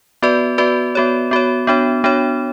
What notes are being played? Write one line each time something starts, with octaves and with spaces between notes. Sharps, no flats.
B3 F#4 B4 D5
B3 F#4 B4 D5
B3 F#4 C#5
B3 F#4 C#5
B3 D4 F#4 C#5
B3 D4 F#4 C#5